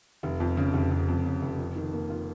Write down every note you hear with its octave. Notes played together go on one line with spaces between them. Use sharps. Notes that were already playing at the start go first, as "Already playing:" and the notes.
F1
F2
C#3
F1
F1
F2
C#3
F1
F2
D#3
A#3
F4